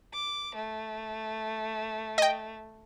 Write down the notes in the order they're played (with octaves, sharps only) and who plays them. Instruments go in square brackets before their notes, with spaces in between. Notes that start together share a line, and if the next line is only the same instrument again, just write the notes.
[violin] D6
A3
[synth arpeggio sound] D#5 G5